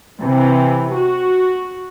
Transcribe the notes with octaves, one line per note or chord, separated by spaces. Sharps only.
C3 E3
F#4